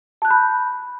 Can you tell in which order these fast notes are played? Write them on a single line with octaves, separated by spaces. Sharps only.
A5 F#6 G6 B5